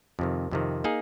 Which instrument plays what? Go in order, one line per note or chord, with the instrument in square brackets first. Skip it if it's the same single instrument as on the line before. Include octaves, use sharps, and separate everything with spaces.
[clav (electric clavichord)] F2 C3 D#3
F2 C3 D#3
A#3 D#4 G#4